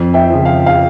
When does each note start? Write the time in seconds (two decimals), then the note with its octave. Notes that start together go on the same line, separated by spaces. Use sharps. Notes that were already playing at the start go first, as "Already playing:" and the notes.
Already playing: F2
0.14 E5 G5
0.30 C#3 F3
0.45 F5
0.66 F5